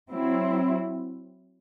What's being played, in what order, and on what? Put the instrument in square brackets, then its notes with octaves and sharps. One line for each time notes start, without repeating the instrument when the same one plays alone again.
[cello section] F#3 C4 E4